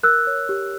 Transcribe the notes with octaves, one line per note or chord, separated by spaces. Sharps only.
A#4 E6 F#6
C#5
G4